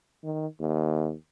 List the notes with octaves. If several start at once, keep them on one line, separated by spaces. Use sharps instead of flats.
D#3
D#2